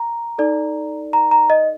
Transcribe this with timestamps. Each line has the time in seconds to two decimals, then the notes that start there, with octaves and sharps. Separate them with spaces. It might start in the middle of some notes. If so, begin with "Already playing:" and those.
Already playing: A#5
0.38 D#4 A4 D5
1.13 A#5
1.31 A#5
1.50 D#5